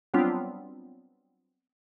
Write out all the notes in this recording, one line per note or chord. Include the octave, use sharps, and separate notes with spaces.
F#3 G3 B3 C4 D4 F4